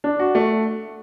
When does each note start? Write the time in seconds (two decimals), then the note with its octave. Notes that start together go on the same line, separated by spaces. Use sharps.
0.04 D4
0.19 F#4
0.35 A3